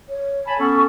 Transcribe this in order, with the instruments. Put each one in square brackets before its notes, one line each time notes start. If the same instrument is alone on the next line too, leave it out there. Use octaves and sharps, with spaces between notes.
[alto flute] C#5
[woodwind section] G#5 A5 B5
[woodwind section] B3 C#4 A4 [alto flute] C#6